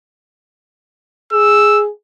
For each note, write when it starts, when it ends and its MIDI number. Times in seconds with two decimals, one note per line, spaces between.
1.33 1.89 68
1.33 1.82 88